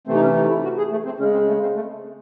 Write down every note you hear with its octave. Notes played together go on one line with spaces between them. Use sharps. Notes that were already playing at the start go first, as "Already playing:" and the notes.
C3 E3 A3 C4
D#4
C#4
D#4
E4
F#4
G#4
A3
C4
C#3 G#3 C#4
C4
A3
C4
A3